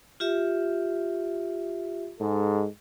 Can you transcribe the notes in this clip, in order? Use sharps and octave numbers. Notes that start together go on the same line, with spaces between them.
F4 G4 E5
G#2 G#3 A4